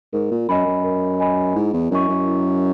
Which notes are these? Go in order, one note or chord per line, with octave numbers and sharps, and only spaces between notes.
G#2 A#4
A#2
F#2 D#5 G#5 B5
F#2
A#4
D#5 G#5 B5
G#2 E4
E2
F#2 A#4 D#5 G#5 C#6
F#2
E4